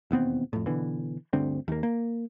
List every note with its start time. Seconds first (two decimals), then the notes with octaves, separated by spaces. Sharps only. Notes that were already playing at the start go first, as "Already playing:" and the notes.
0.11 E1 D#2 B3 C4
0.53 F2 A2
0.66 B2 D3 E3
1.33 D2 G2 D3 C4
1.68 D#2 A#3
1.83 A#3